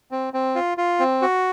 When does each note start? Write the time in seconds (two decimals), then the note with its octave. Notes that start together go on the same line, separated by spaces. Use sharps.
0.11 C4
0.34 C4
0.55 F4
0.78 F4
0.99 C4
1.22 F#4